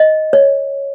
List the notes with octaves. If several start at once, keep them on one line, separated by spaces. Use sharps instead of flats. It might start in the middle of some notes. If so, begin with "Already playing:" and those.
Already playing: D#5
C#5